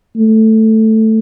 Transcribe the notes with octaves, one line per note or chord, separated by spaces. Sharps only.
A3